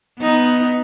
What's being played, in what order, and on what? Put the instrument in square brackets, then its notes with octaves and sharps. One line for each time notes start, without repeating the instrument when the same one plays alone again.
[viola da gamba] B3 D#4